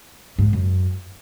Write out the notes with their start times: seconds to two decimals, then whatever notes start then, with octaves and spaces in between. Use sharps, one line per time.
0.39 G#2
0.53 F#2